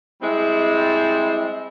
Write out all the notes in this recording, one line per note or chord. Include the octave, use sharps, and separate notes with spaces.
G3 G#3 C4 E4